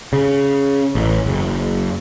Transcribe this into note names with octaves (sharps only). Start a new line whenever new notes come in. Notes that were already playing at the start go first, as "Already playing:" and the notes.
C#3
A1
F#1